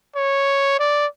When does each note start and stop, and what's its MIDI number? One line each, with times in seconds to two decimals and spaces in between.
0.15 0.79 73
0.79 1.06 74